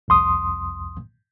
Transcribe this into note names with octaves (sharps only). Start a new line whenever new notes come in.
C2 F2 C6 D#6